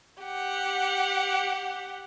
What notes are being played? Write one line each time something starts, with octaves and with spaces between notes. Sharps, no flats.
G4 F#5